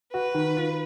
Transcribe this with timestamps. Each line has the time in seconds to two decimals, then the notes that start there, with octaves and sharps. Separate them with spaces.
0.13 F#4 B4
0.35 D#3
0.57 F4